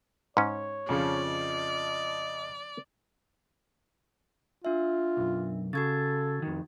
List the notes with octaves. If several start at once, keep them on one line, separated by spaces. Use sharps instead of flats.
G#2 C#4 C#5
F2 C#3 F3 D5
D#5
D4 F4 E5
B1 F#2
C#3 F#4 A4 G#6 A6
F2 D#3